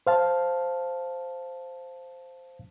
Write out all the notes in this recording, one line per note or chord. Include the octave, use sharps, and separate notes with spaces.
C5 F5 A5